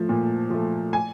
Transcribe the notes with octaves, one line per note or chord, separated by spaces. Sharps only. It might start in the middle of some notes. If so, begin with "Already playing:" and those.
Already playing: F3 A3
A#2
F3 A3
G#5